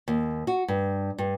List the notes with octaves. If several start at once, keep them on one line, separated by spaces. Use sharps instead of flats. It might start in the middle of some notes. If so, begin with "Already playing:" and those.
D#2
F#4
G2
G2